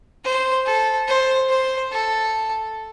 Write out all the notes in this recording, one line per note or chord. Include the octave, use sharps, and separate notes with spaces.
C5
A4
C5
C5
A4